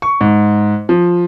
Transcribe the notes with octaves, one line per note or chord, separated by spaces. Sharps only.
C#6
G#2
F3